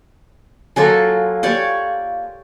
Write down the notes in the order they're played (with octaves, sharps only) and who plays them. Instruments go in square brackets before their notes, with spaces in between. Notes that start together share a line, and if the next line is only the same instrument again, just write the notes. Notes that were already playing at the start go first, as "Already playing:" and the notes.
[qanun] F#3 F#4 A4 [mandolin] A#3 F4 G#4
[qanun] G4 C#5 D5